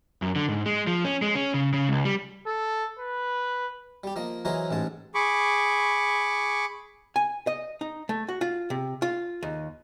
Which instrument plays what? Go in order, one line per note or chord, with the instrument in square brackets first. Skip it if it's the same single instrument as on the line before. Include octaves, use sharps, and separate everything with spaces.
[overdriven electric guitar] F#2
D3
G#2
G#3
F3
C#4
G#3
C#4
C#3
C#3
C#2
G3
[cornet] A4
B4
[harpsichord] G3 G4
F3 A#3 D#5
E3 F#3 G#4 A#4 C5 D#5
A1 G#2 G#3 A5
[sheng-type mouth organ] G#4 B5 C#6 D6
[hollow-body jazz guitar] G#5
D#5
D#4
A3
F#4
F4
C3
F4
D#2